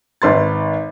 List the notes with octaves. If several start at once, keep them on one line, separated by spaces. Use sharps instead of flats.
G#1 B4 C6 A6